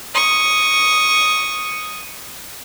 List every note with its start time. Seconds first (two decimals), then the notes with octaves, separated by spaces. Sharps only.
0.14 C#6 D#6